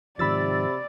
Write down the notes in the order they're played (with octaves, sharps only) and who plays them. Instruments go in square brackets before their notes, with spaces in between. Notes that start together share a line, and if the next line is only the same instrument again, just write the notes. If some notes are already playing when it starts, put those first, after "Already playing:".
[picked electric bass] G#2 D#3 F3 [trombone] C3 [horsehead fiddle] D5 [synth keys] B5 E6 A6